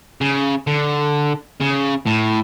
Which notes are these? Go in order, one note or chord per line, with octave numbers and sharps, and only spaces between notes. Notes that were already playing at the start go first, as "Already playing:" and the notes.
C#3
D3
C#3
A2